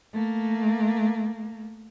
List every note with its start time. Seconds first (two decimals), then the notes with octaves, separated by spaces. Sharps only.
0.13 A3 A#3